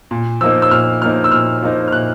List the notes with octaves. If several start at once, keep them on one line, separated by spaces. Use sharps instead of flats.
A#2
F3 A#3 D#4 E6
E6
A#2 F6
F3 A#3 D#4 F6
E6
A#2 F6
F3 A#3 D#4
F6
A#2 F#6